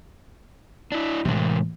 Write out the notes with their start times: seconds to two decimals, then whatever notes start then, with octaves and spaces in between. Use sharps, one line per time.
0.92 D4 E4
1.25 A2 C3 E3 G#3